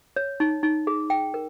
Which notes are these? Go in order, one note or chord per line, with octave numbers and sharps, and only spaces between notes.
C#5
D#4
D#4
G#4
G5
A#4